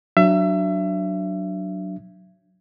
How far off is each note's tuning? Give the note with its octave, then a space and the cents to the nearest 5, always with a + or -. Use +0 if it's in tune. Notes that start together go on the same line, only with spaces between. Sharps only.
F#3 +0 D4 +5 E5 +30